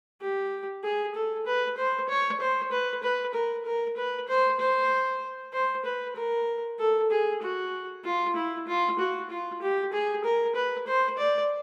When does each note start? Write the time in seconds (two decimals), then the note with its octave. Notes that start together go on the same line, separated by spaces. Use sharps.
0.21 G4
0.84 G#4
1.15 A4
1.46 B4
1.77 C5
2.09 C#5
2.40 C5
2.71 B4
3.03 B4
3.34 A#4
3.65 A#4
3.97 B4
4.28 C5
4.59 C5
5.53 C5
5.85 B4
6.16 A#4
6.79 A4
7.11 G#4
7.42 F#4
8.04 F4
8.36 E4
8.67 F4
8.99 F#4
9.30 F4
9.62 G4
9.93 G#4
10.24 A#4
10.55 B4
10.87 C5
11.18 D5